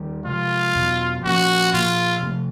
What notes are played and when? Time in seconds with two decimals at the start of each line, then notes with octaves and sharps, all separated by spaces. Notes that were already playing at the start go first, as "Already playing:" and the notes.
Already playing: D#2 D#3 G3
0.25 C3 F3 G#3 F4
0.75 E2 B2 F#3
1.24 A#2 F3 A#3 C#4 F#4
1.73 A#2 F3 A#3 F4
2.23 C3 F3 A3